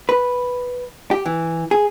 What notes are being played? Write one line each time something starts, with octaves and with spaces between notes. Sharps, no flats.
B4
G4
E3
G#4